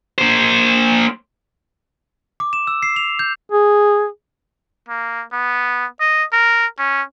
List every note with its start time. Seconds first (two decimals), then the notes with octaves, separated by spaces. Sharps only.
0.18 A#3 C5
2.40 D6
2.53 E7
2.67 E6
2.83 C7
2.96 F7
3.19 G6
3.52 G#4
4.89 A#3
5.33 B3
6.00 D#5
6.33 A#4
6.79 C#4